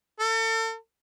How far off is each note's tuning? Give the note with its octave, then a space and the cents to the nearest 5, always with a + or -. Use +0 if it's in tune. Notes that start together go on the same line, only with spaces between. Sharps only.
A4 +40